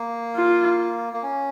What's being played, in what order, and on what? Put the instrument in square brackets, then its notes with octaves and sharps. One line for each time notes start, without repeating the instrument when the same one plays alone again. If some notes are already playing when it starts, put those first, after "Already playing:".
Already playing: [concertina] A#3
[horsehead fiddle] F4
[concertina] A#3
C#4